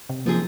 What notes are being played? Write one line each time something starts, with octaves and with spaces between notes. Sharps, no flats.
C3
F3 A#3 C4 D#4 G#4